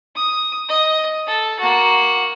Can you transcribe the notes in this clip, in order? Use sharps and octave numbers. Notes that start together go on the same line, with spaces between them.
D#6
D#5
A4
A#3 F#4